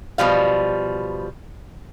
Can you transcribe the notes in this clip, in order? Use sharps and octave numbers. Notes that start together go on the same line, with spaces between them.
B2 F3 G3 F5